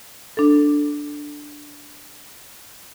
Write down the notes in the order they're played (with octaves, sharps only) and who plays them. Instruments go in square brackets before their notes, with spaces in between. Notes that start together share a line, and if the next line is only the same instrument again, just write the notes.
[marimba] D4 A4